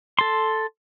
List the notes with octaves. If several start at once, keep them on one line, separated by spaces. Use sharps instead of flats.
A4 C6